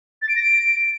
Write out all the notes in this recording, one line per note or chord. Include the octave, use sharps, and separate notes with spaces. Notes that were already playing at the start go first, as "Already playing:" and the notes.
A6
D7
A#6
D7